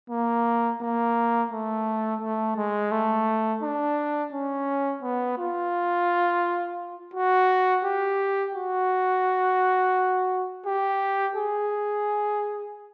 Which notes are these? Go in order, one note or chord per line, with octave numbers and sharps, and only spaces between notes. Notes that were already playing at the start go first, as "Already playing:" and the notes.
A#3
A#3
A3
A3
G#3
A3
D4
C#4
B3
F4
F#4
G4
F#4
G4
G#4